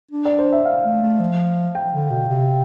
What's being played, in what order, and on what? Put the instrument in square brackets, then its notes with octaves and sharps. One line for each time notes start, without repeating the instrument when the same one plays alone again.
[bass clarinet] D4
[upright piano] D5
C5
E5
F5
[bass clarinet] A3
A3
F3
[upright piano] G5
[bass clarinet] D3
B2
C3